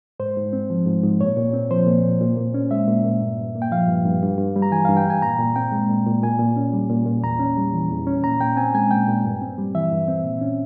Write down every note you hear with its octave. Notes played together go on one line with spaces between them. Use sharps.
G#2 C5
G#2
C4
F3
G#2
G#2
A#2 C#5
A#2
C4
F3 C5
A#2
A#2
A#2
A#2
C#4
G#3 E5
A#2
A#2
G2
G2
A#3
G5
F3 F5
G2
G2
G2
G2
G3
A#5
E3 G#5
G2 F5
G5
G2 G#5
A#2 A#5
A#2
C4 G5
G#3
A#2
A#2
A#2 G#5
A#2
C#4
G3
A#2
A#2
E2 A#5
C#4
G3
E3
E2
C#4
A#2 A#5
A#2 G5
C4 G#5
G#3 G#5
A#2 G5
A#2
G2
C4
G3
E3 E5
G2
C4
A#2
C#4